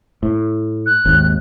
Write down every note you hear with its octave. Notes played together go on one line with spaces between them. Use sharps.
A2
F#6
G#1 D#2